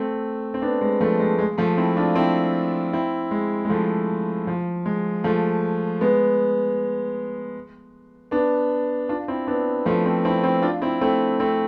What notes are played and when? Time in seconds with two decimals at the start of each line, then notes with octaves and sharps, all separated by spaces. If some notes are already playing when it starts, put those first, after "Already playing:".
Already playing: A3 C4
0.54 C4
0.62 B3 D4
0.81 G#3 B3
1.01 F3 A3
1.20 G#3
1.39 G#3
1.58 F3 A3
1.77 C4 E4
1.97 D4 F4
2.15 C4 E4
2.93 C4 E4
3.31 G#3
3.65 G#3
3.69 F3 A3
4.47 F3
4.86 G#3
5.24 F3 A3
6.01 G#3 B3
8.31 B3 D4
9.09 D4 F4
9.28 C4 E4
9.47 B3 D4
9.86 F3 A3
10.05 A3 C4
10.25 C4 E4
10.44 C4 E4
10.62 D4 F4
10.82 C4 E4
11.01 A3 C4
11.40 A3 C4